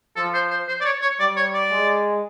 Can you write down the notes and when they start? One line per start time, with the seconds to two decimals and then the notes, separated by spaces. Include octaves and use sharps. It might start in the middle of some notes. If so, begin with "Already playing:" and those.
0.16 F3 A4
0.34 C5
0.51 C5
0.68 C5
0.81 D5
0.85 C#5
1.02 C#5
1.20 G3 D5
1.36 C#5
1.54 D5
1.71 G#3